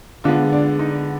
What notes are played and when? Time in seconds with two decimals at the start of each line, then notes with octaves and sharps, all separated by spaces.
0.24 D3 G#3 B3 F4
0.52 D4
0.79 D#4